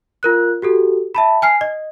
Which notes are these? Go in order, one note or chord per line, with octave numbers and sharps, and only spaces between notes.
F4 A#4 F#6
F#4 G4 A4
E5 A5 B5
G#5 F6 C7
D#5